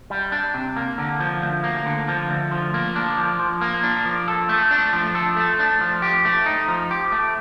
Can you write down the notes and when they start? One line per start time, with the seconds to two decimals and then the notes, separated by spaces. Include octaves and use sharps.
0.10 G3
0.32 D4
0.54 C3
0.76 A#3
0.98 D3
1.20 F3
1.42 D2
1.64 A#3
1.86 D3
2.08 F3
2.30 D2
2.51 F3
2.74 A#3
2.96 D4
3.17 F3
3.40 F3
3.61 A#3
3.83 D4
4.05 F3
4.28 A4
4.49 A3
4.71 D4
4.93 F3
5.15 A4
5.37 A3
5.59 D4
5.81 F3
6.02 G4
6.25 A3
6.46 D#4
6.68 F3
6.91 G4
7.12 A3